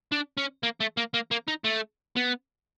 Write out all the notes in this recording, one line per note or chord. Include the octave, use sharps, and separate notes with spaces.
D4
C#4
A#3
A3
A#3
A#3
A#3
D#4
A3
B3